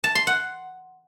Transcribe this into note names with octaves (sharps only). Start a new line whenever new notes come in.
A5
C6
F#5